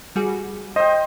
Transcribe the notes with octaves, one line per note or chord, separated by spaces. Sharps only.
G3 F#4 G#4
C5 D#5 G5 D#6